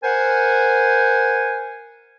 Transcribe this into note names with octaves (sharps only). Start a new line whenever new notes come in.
A#4 C5 F#5 G#5